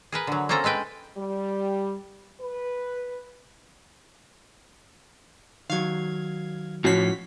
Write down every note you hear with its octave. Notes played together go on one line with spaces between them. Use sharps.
G#4 A#4 B4
D3 F#3
A#3 C4 C#4 A4 A#5
G#3 A4 B4 G5
G3
B4
D#3 F#3 F5 G#6
A2 F3 C#4 F#4 B6